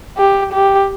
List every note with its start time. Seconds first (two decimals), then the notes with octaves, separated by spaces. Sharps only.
0.18 G4
0.53 G4